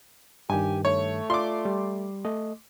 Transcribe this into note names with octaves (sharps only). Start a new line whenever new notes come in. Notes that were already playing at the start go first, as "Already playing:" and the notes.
G2 D#3 G4 G#5
A3 C#5
F4 D5 C6 D6
G3
A3 D#5